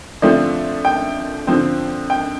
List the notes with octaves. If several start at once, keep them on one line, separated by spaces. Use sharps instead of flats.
D3 F3 A3 C4 D5
G5
D3 F3 C4
G5